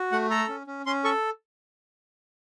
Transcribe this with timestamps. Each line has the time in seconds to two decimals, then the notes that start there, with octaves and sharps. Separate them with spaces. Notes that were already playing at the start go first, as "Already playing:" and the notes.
Already playing: F#4
0.12 A3 F#5
0.30 A4 A#5
0.48 C#4
0.67 C#4
0.86 C#4 C6
1.04 A4 C#6